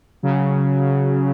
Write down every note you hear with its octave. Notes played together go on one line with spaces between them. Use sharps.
C#3 F#3